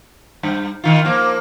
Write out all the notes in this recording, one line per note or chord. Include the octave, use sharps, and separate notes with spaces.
G2
D#3 F4
F3 A#3